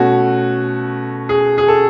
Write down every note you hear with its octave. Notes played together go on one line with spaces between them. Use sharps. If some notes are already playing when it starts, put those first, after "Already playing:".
Already playing: B2 A3 C#4 F#4
G#4
G#4
A4